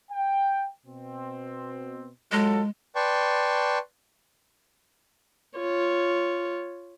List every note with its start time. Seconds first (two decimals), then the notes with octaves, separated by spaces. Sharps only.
0.11 G5
0.87 B2 C4
2.32 F#3 G#3 F4 A4
2.96 B4 D5 G5 A5 C6 C#6
5.58 F4 C#5